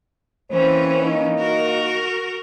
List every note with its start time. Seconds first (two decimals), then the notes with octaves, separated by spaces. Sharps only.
0.51 E3 A#3 C4 C#4 C5
1.02 A#3 D#4
1.38 F#4 A#4